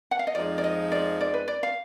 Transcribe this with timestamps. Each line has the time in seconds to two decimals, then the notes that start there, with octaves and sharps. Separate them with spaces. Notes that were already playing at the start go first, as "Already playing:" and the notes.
0.11 F#5
0.19 F5
0.27 D#5
0.35 F2 F3 G#3 D#4 D5
0.58 D5
0.64 D#5
0.92 D5
1.21 D5
1.34 B4
1.48 D5
1.63 F5